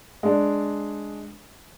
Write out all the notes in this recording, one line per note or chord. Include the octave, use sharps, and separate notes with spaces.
G#3 D4